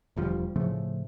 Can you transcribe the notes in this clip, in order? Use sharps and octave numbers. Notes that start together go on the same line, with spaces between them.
E1 D2 F3 G3
A2 C#3 F3 A3